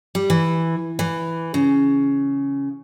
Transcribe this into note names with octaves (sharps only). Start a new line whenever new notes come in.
G3
E3
E3
C#3